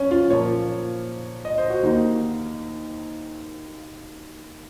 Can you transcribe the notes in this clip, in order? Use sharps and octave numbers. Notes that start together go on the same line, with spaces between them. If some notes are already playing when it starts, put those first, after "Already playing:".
Already playing: F#2 C#4
F4
A#2 F3 A#3 C#5
D#5
C5
F#4
D#2 D#3 A#3 D#4